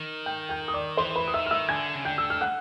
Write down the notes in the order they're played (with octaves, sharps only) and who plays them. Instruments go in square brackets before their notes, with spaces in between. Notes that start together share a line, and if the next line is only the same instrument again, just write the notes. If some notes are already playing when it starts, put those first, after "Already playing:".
Already playing: [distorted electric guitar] D#3
[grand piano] G5 G6
G5 G6
D#6
D5 D6
[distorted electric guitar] E3 [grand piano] C5 C6
[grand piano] B4 B5
D#6
[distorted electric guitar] D#3 [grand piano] E5 E6
[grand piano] F6
E5 E6
[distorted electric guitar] D3 [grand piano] G#5 G#6
[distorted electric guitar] C#3
[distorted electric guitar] D3 [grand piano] G5 G6
[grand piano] E6
F6
F#5 F#6